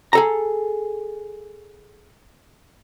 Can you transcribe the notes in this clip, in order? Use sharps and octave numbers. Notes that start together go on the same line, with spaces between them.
G#4 A4 A#5